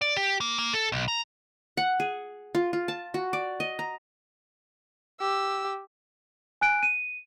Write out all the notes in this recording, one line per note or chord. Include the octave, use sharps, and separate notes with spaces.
D5
G4
A#3
A#3
A4
B1
A#5
F#5
G#4
F4
F4
A5
F#4
D5
D#5
A#5
G4 E6
G#5 F#6 D7
D#7